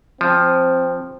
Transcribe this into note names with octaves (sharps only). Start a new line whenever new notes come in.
F3 C4